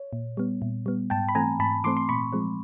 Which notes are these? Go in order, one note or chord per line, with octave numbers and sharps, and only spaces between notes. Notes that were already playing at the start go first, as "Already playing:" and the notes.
Already playing: C#5
A#2
G3 B3
A#2
G3 B3
G#2 G5 A5
B5
E3 A3 C4 G#5 A#5
G#2 A5 B5
E3 A3 C4 C6 D6
C6
A#2 B5 C#6
F3 G#3 C4